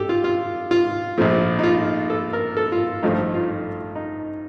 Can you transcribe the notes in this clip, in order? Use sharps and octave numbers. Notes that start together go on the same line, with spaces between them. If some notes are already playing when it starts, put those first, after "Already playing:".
Already playing: G4 A4
F4
F4
F4
A#1 A#2 F3 A3
D#4
F4
A4
A#4
A4
F4
A1 G2 F3 A3 D#4
F4
D#4